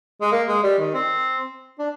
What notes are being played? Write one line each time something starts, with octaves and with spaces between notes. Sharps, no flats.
G#3
A#3
G#3
G3
D#3
C4
D4